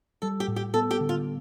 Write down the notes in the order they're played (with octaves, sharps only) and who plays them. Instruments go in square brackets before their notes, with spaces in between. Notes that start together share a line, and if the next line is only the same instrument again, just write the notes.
[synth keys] G3 [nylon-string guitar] A4
[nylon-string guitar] G4
[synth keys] A2
[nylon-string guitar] G4
[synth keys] B3 [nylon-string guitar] A4
[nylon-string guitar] G4
[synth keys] D3
[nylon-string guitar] F4